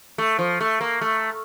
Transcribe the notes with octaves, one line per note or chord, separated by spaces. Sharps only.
A3
F3
A3
A#3
A3